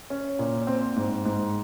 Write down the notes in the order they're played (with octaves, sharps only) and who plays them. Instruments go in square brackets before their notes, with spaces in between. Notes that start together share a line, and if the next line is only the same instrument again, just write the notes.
[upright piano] C#4
A#2
C4
G#2
G#2